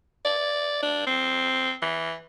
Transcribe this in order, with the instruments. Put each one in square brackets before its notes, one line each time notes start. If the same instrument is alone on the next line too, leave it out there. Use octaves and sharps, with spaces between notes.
[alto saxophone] D5
D4
C4
E3